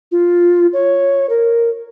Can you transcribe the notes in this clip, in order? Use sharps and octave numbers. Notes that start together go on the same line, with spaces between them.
F4
C#5
A#4